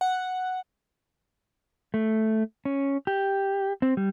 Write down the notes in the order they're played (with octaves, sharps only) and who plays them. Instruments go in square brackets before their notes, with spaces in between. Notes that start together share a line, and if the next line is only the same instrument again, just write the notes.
[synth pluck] F#5
[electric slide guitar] A3
C#4
G4
C4
G3